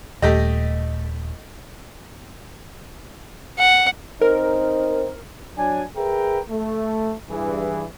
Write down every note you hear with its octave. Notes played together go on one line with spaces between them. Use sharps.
D#1 A3 G4 D#5
F#5
C4 D#4 A#4
F#3 D4 G#5
G#4 A#4 B4 E5 G5 A#5
A3
G2 E3 G#4